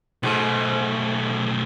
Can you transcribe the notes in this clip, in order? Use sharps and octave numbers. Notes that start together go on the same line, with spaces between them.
B1 G#2 B2 A3